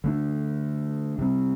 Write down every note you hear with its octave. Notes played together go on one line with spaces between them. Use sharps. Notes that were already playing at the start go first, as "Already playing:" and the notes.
D3 A3 D4
C3 G3 C4